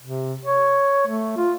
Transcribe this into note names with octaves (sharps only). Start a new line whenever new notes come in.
C3
C#5
A3
F4